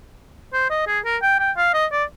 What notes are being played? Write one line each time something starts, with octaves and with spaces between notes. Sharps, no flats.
C5
D#5
G#4
A#4
G5
G5
F5
D#5
D5